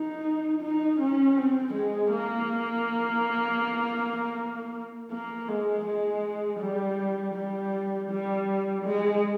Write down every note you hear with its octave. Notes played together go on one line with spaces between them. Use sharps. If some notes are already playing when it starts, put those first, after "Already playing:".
Already playing: D#4
D#4
C#4
C4
G#3
A#3
A#3
G#3
G#3
G3
G3
G3
G#3